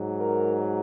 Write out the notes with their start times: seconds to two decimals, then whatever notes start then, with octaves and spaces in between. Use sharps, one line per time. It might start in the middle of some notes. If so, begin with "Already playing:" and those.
Already playing: G#2 F#3
0.19 A#4